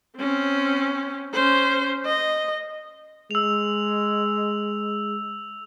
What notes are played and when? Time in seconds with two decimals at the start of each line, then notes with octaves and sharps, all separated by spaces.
0.18 C4 C#4
1.33 C#4 C5
2.05 D#5
3.31 G#3 E6 F7